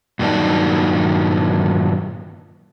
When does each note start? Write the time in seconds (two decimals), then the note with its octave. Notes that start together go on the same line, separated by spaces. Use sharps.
0.19 G2 A#2 D#3 F#3 D4 D#4